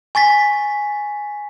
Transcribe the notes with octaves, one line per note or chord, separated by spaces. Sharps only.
G#5 C#6 A6 B6